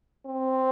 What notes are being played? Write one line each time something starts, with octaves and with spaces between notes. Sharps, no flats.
C4